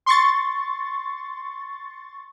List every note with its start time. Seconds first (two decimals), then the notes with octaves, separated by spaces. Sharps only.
0.06 C6 C#6 A6